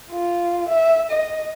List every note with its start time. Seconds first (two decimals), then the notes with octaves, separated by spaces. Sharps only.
0.11 F4
0.69 E5
1.11 D#5